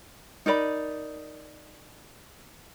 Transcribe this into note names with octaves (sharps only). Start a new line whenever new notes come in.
D#4 A#4 D5 B5